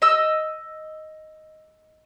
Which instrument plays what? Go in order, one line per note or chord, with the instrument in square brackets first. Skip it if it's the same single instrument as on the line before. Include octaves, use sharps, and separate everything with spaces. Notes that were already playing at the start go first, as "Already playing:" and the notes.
[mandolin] D#5 E6